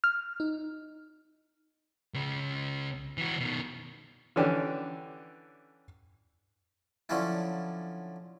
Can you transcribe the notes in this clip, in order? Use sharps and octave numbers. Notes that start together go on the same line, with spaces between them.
F6
D#4
C#2 C#3
E3 F#4
B2 D#3
D3 E3 C#4 D4 G4
D3 F3 F#3 C#4 D4 E4